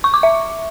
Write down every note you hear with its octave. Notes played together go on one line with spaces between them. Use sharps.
C#6
D6
E5